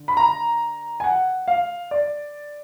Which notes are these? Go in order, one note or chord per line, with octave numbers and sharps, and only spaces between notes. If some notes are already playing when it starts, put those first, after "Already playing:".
Already playing: D3
B5
A#5
G#5
F#5
F5
D5